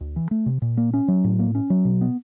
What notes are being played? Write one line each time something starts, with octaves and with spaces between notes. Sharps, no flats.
D2
E3
A3
C3
A#2
A#3
C#4
F#3
A2
A#3
C#4
F#3
B2
B3